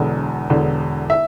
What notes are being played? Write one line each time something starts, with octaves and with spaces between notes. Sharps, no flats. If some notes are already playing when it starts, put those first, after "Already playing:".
Already playing: E1 E2 D3
E1 E2 D3
E5